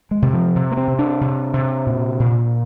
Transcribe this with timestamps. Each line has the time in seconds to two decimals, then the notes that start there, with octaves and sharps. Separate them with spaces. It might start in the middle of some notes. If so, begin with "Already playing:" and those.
0.11 G#3
0.22 C3
0.33 F3
0.56 C3
0.71 A#3
0.77 C4
0.87 C3
0.99 D4
1.21 C3
1.54 C3
1.86 A#2
2.20 A#2